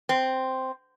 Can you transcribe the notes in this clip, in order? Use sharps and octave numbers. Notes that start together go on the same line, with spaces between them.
C4